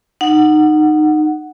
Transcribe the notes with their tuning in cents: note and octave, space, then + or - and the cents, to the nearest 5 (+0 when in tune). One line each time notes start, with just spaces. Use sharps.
D#4 -20 F#5 +0